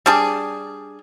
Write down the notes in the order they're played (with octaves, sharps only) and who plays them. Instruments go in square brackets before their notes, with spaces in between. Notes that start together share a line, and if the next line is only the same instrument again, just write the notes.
[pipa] G3 D4 G#4